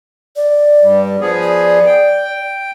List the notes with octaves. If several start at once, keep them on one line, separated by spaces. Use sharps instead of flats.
D5
G2 G3
F3 B3 G#4
D5
G5